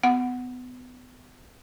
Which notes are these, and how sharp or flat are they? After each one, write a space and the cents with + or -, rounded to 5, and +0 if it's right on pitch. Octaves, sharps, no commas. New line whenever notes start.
B3 +25 F#5 +0